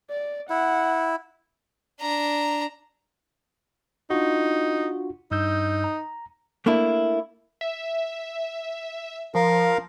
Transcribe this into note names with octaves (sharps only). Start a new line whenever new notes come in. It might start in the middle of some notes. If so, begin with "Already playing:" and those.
D5
E4 F#5
D4 A#5
D4 D#4 F4 F#4
G2 D#4 E6 G6
A#5
A3 A#3 D4 E4
E5
F3 A#4 F5